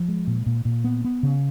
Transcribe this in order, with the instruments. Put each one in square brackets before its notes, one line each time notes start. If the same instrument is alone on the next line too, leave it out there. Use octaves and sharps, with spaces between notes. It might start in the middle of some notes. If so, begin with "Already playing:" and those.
Already playing: [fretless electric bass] F3
G#3
A#2
A#2
A#2
B3
B3
C#3